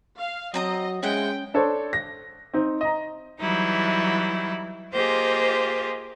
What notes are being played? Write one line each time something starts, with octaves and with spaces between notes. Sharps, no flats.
F5
F#3 C4 D#5 A#5 D#6
G#3 C4 C#4 E4 F#5 G5
D4 A4 C5 C#5
A#6
C4 D#4
D#5 A#5
E3 F#3 G3 D#4 E4
A#3 F4 G4 G#4 C5 D#5